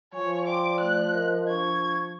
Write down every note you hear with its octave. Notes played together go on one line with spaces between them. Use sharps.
F3 C#5 G#5
D5 G5 C6 D6
A3 F#6
A#4 D#5
D4 C#6 G#6